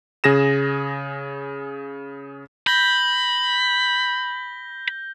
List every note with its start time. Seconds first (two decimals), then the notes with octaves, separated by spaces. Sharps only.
0.24 C#3 G#4 A#6 E7
2.67 B5 G6 A#6 G7